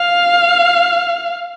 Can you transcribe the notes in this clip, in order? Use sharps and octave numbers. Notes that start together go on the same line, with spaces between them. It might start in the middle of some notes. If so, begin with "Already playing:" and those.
Already playing: F5